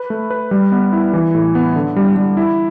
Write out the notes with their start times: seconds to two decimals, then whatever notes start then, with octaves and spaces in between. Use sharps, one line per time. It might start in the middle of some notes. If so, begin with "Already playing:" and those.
Already playing: B4
0.10 A3
0.30 B4
0.51 G3
0.72 B3
0.92 E4
1.13 E3
1.35 A2
1.55 B3
1.76 D3
1.96 G3
2.16 G3
2.37 E4